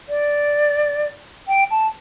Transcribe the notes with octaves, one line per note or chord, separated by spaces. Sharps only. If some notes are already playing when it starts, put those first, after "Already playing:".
D5
G5
A5